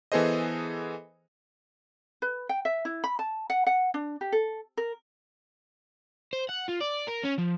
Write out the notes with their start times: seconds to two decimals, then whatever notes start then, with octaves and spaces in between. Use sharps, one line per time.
0.12 E3 B3 G#4 A4 C5 D#5
2.22 B4
2.49 G5
2.65 E5
2.85 E4
3.04 B5
3.19 A5
3.50 F#5
3.67 F#5
3.94 D4
4.21 G4
4.32 A4
4.77 A#4
6.33 C5
6.49 F#5
6.69 F4
6.81 D5
7.07 A#4
7.24 C#4
7.38 F3